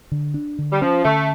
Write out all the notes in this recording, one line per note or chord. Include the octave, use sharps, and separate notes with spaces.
D3
D4
D3
G3
F3 C#4
D3 A3